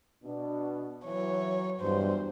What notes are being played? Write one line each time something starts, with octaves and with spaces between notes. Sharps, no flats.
B2 D4
E3 F#3 C#5
E2 G2 F#3 C5